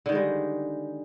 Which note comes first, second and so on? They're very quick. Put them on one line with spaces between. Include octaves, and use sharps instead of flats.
D3 D#3 G#3 G3